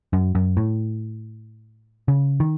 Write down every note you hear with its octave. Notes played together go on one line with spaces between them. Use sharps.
F#2
F#2
A2
C#3
D#3